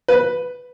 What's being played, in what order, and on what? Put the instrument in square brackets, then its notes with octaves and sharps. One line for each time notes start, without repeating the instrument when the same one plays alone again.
[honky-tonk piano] B4